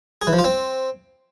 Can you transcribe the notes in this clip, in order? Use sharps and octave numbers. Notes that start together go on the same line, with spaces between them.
G#4
E3
F3
F4
C4